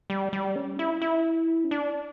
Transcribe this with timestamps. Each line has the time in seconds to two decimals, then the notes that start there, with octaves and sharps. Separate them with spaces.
0.10 G3
0.33 G3
0.56 C#4
0.79 E4
1.01 E4
1.64 C#4
1.71 D4